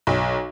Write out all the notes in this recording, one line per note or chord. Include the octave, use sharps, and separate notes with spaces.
B1